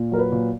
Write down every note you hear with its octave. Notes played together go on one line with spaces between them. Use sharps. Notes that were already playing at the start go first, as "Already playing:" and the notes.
Already playing: A#2
F#3 A#4
B4
A#2